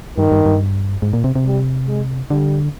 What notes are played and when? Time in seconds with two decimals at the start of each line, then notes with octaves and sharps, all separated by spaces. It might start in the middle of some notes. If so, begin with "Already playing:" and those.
0.18 G2 D#3
0.32 G2
0.46 G2
1.02 G#2
1.13 A#2
1.24 C3
1.36 C3
1.45 G3
1.88 G#3
2.30 D3 G3